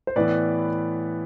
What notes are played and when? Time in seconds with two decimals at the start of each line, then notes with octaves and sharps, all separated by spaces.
0.07 C5
0.16 A2 E3 B3 B4 D5